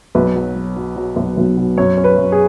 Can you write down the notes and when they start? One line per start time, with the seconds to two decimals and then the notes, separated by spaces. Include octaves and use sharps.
0.15 B1 B4
0.36 F#3
0.56 F#3
0.76 F#3
0.96 F#3
1.16 B1
1.37 B1
1.57 B2
1.78 F#2 C#5
1.97 C#4
2.04 B4
2.18 F#2
2.32 G#4